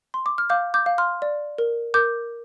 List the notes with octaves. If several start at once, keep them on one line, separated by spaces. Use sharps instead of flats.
C6
D6
F6
F5 D6 G6
D6 G6
F5
C6 F6
D5
A#4
A#4 D6 G6